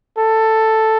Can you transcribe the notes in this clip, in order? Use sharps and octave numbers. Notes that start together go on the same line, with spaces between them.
A4